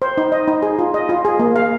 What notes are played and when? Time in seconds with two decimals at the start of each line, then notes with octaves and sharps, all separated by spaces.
0.02 C5
0.18 D#4
0.32 D#5
0.48 D#4
0.62 G#4
0.79 F4
0.94 D#5
1.09 F4
1.25 G#4
1.39 A#3
1.56 F5